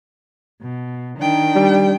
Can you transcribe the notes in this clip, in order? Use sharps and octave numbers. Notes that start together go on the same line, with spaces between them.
B2
D#3 D4 G5
G3